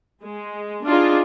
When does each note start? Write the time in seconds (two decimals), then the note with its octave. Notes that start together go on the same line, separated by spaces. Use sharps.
0.23 G#3
0.87 D4 D#4 F4 G#4 D5